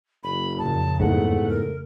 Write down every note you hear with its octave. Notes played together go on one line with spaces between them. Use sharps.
F#1 B5
F2 A#2 C#3 A5
E2 G#2 A3 F#5
A#4